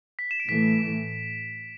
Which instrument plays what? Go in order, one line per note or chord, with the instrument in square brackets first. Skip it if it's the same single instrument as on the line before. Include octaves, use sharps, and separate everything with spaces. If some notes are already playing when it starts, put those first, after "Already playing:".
[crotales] B6
E7
D7
[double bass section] A2 E3 A3 [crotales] B6